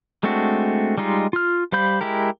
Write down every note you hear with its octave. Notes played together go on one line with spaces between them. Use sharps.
G#3 A3 C4 D4 F#4
G3 G#3 D#4 F4
F4 F6
G3 C5 F5 B5 G6
G#3 E4 G4 A#4